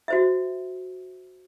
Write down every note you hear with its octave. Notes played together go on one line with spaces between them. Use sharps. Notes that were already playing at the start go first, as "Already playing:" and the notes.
F#4 C5 E5